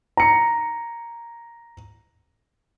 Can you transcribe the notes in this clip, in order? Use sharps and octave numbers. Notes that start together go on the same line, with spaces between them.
A#5 C#7